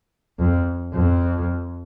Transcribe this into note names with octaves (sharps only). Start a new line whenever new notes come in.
F2
F2